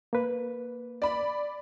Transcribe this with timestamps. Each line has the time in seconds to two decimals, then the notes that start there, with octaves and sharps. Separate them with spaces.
0.13 A#3 B4
1.02 D5 B5